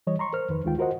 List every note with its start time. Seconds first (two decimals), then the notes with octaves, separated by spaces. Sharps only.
0.07 E3 G3 C#5 D#5
0.19 A#5 C6 C#6
0.33 A#4 C5 F6
0.49 F2 D#3 B4
0.64 D2 D#3 G#3 F4 G5
0.78 F4 F#4 A#4 C5 D#5 F#5